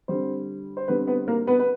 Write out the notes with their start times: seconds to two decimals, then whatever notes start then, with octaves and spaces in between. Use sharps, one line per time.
0.08 D3 G3 C4 C5
0.77 C5
0.88 D3 G3 B3 C4 B4
1.07 B3 B4
1.28 A#3 A#4
1.47 B3 B4
1.59 B4